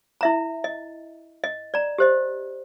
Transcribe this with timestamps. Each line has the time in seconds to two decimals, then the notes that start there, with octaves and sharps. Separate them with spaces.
0.21 E4 E5 A#5
0.64 D#5
1.44 D#5
1.74 D5 A#5
1.98 G4 C5 D#5